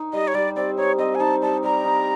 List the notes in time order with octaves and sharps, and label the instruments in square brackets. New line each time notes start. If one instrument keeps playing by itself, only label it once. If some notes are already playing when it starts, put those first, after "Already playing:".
Already playing: [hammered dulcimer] D#4
[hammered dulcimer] G3 [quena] D#5
[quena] C#5
[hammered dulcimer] G3 [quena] D5
[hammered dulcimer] C4 [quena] D5
[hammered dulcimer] D#4 [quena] C#5
[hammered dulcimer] C4 [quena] D#5
[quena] G#5
[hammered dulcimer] D#4 [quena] A5
[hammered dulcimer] G3 [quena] A5
[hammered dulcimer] G3 [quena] A#5
[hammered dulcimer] D#4